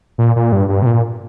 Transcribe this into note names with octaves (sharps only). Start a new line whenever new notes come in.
A#2
A#2
G2
G2
C3
A#2